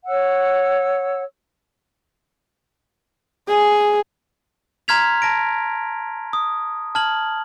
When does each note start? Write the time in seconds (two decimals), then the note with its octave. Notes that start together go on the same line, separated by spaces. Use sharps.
0.06 C#5 F#5 E6
3.48 G#4
4.88 A#5 C6 F6 G#6 B6 F7
5.22 A5 A#6 D7
6.33 D#6
6.95 A5 F6 G#6 F#7